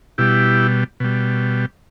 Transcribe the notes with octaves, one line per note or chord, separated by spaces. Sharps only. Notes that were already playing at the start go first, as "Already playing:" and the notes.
B2 G3 E4 G4
B2 G3